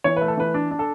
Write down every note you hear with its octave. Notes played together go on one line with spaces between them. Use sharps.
E3 C#5
A3 B4
A4
E3 B4
D4
D4
A4